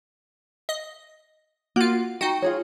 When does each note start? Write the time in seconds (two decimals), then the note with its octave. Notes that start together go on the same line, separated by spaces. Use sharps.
0.69 D#5
1.76 A#3 F4 F#4
2.21 D#4 F#4 G5
2.42 F4 G#4 C#5